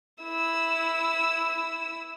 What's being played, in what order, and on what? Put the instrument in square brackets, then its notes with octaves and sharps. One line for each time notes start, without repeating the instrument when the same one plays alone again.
[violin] E4 E6